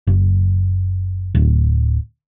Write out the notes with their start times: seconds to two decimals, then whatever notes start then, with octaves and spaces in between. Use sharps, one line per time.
0.07 F#1
1.35 D1